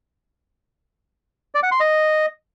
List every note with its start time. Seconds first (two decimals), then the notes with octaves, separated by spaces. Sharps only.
1.55 D5
1.63 F#5
1.72 C6
1.80 D#5